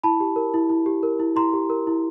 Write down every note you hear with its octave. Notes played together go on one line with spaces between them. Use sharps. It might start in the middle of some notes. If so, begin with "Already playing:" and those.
E4 A5 B5
G4
A#4
E4
E4
G4
A#4
E4
E4 A#5 C6
G4
A#4
E4